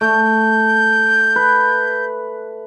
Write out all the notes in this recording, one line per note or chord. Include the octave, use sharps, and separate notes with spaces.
A3 G6
B4